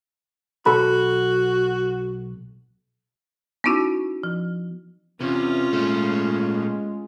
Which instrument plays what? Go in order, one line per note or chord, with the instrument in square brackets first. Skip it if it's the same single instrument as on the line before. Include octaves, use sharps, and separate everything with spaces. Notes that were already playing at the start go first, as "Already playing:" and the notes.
[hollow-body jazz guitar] B1 A4 B5 [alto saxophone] F#4
[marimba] B3 C#4 D#4 E4 F#4
F3
[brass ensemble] E2 [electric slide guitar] C3 [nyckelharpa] C#4 F4
[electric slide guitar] A#2 A3 [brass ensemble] G#3